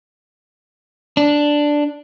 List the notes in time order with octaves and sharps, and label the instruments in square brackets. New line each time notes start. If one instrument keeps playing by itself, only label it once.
[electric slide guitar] D4